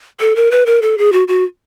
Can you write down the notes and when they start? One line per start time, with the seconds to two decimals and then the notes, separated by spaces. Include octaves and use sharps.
0.20 A4
0.36 A#4
0.51 B4
0.66 A#4
0.82 A4
0.98 G#4
1.12 F#4
1.28 F#4